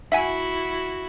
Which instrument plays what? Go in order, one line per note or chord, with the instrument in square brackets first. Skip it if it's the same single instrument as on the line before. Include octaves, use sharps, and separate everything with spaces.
[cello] E4 F#4 [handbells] E5 F#5 G#5